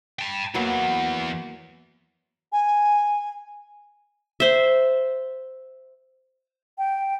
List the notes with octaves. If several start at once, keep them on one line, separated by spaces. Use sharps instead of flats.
G5 A5
E2 E3 F#3 A#3 B3
G#5
C5 E5
G5